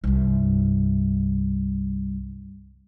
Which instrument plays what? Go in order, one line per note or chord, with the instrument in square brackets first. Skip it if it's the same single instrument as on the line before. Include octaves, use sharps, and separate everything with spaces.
[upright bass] C2 G2